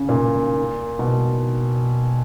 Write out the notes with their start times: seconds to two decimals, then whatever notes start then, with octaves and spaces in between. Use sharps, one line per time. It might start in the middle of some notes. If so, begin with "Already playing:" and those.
Already playing: C#3
0.09 A#2
0.99 B2